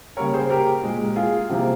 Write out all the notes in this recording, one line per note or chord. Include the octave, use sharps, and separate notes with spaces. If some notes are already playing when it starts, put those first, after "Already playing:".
C#3 G3 A#3 A#4 C#5
G#4 C5
G4 A#4
A#2 G#3
F4 G#4
C3 F3 A#3